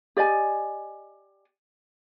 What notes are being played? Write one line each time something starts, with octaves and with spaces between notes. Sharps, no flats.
G4 D5 D#5 G#5